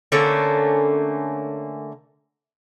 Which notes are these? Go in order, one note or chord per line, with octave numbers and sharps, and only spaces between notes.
D3 A3 A#3 C#4